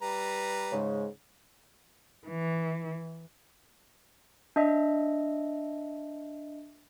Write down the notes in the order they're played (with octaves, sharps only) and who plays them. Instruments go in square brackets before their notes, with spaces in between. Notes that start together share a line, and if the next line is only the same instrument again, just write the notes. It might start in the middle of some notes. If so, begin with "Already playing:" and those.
[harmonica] G3 B4 A#5
[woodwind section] G#2 C#3 G#3
[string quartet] E3
[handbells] D4 D#5 E5